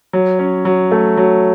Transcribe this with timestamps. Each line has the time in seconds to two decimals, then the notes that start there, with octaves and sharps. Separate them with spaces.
0.13 F#3
0.39 C#4
0.65 F#3
0.91 A3
1.17 F#3